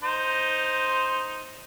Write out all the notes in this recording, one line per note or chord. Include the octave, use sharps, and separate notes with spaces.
D#4 C5 C6